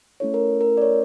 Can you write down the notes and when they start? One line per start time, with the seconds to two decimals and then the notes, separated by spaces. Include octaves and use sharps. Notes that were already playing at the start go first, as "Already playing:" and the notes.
0.20 A3 C#4 E4 A4 C#5
0.34 A#4
0.61 A#4
0.77 D5
0.82 C#5